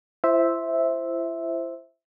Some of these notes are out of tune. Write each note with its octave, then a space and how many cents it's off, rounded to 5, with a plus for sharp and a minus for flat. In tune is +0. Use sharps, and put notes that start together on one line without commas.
E4 +40 C5 +0 E5 -5